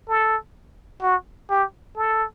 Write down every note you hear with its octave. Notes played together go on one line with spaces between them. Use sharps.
A4
F#4
G4
A4